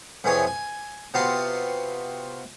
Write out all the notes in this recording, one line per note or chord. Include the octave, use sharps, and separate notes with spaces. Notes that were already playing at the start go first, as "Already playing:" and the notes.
F2 C3 E3 G#4 C#5 G#5
G#5
C3 B3 F4 F#4 A5 C6